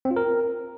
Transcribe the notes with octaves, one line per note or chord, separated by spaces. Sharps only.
C4
F4
A#4